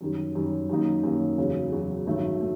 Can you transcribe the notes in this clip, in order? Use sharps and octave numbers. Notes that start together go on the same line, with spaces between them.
F#2 D#3 G3
F#2 D#3 G3
F#2 D#3 G3 A#3 D#4
F#2 D#3 G3 A#3 D#4
E2 C#3 F#3
E2 C#3 F#3
A1 G2 D#3 F#3 A3
A3